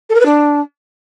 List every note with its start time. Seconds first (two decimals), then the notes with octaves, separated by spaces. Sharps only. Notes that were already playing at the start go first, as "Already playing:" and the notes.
0.09 A4
0.15 A#4
0.20 B4
0.25 D4